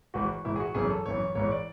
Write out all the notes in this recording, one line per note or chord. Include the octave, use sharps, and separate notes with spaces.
G#1 G#2 E3 F#4
G#1 G#2 E3 E4
G#4
F#4
G#1 F#2 E3 G#4
A4
G#1 F#2 E3 C#5
G#1 G#2 E3 C#5
D5